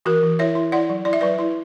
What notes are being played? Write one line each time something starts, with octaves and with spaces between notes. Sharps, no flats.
E3 F#4 A#4
E3
E4 C#5 E5
E4
E4 D5 F#5
F#3
E4 D5
E5
F#3 B4 D5
E4